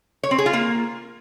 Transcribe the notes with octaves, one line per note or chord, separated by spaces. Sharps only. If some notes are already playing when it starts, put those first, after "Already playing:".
C#5
C4
G#4
F4
A#3